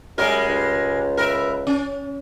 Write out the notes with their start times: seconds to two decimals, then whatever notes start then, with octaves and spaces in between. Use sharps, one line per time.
0.18 F#2 G3 G#3 A#4
0.49 C#2
1.17 A#4 B4 E5
1.67 C#4